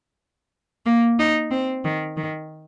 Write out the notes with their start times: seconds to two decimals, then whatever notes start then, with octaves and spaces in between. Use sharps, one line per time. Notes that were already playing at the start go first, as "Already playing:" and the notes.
0.86 A#3
1.19 D#4
1.51 C4
1.84 D#3
2.17 D#3